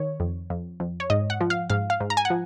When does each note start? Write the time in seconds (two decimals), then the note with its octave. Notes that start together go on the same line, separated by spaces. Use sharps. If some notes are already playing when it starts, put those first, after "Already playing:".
Already playing: D#3 C#5
0.20 F2
0.50 F2
0.80 F2
1.00 C#5
1.10 G#2 D#5
1.30 F#5
1.41 F3
1.50 F5
1.70 G#2 F5
1.90 F5
2.00 G#2
2.10 A#5
2.17 G#5
2.25 F#5
2.30 F3